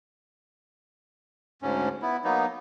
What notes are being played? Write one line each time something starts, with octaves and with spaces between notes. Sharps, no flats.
D2 G#2 C#4
B3 E4
F#3 A#3 B3 D#4